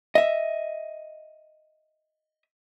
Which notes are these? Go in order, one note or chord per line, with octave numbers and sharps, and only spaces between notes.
D#5 E5